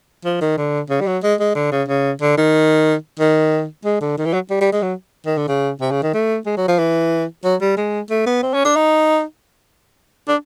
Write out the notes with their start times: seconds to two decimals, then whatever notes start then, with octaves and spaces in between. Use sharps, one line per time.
0.25 F3
0.41 D#3
0.58 D3
0.90 C#3
1.01 G3
1.07 F#3
1.23 G#3
1.40 G#3
1.55 D3
1.72 C#3
1.88 C#3
2.22 D3
2.38 D#3
3.20 D#3
3.85 G#3
4.01 D3
4.18 D#3
4.26 E3
4.34 F#3
4.51 G3
4.61 G3
4.73 G#3
4.82 F#3
5.26 D#3
5.37 D3
5.48 C#3
5.81 C3
5.91 C#3
6.03 D#3
6.14 A3
6.46 G#3
6.57 F#3
6.68 F3
6.79 E3
7.44 F#3
7.61 G3
7.77 G#3
8.10 A3
8.26 B3
8.43 C4
8.54 C#4
8.65 D4
8.76 D#4
10.28 D4